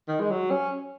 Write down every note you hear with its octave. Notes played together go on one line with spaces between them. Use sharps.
D#3
G#3
F#3
C#4